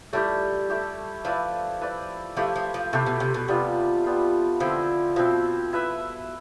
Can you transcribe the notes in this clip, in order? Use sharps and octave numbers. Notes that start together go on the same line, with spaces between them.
G3 A3 E4 G4
A3 E4 G4
F3 E4 B4 D5
E4 B4 D5
F3 A3 E4 G4
F3
F3
C3 A3 E4 G4
B2
C3
B2
C3 G3 B3 F4
G3 B3 F4
D3 F3 C4 E4
B2 F3 C4 E4
E4 B4 E5